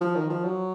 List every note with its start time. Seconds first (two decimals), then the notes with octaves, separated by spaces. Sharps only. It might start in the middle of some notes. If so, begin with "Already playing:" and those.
0.01 F3
0.15 D#3
0.30 F3
0.45 F#3